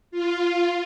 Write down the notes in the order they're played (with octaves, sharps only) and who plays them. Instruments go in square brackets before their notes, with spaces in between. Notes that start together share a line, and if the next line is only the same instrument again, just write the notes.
[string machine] F4